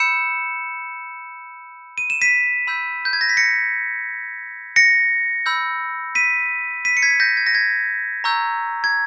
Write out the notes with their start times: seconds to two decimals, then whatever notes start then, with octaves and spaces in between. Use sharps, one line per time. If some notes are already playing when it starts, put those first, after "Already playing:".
Already playing: B5 E6 G6 C#7 E7
1.98 D#7
2.10 E7
2.22 B6 D#7
2.67 B5 E6 G6
3.05 G6
3.13 G#6
3.21 A#6
3.29 B6
3.37 A#6 C#7
4.76 A#6 C#7
5.46 B5 E6 G6
6.15 B6 D#7
6.85 B6 D#7
6.97 C#7
7.02 G#6 B6
7.20 G6 A#6
7.37 G#6
7.47 A#6
7.55 G#6
8.24 A#5 C#6 E6 G6
8.84 G#6